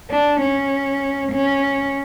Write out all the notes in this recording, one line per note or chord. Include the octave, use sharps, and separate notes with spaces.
D4
C#4
C#4